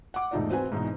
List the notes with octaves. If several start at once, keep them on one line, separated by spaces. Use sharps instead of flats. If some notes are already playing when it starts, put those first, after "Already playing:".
F#5 D6
E1 G#2 A3 D#4 F4 D5
C4 F#4 B4 C5 G#5
G#2 B2 E3 D#4